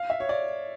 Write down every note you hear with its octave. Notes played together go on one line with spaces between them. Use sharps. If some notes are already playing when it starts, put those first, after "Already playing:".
Already playing: F5
E5
C#5
D5